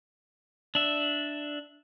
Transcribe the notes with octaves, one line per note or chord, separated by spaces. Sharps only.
D4 E5